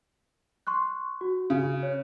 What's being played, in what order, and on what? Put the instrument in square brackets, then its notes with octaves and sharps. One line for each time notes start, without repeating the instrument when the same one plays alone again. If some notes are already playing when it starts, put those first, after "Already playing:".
[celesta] C6 C#6 F#6
F#4
[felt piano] C#3
[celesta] C#5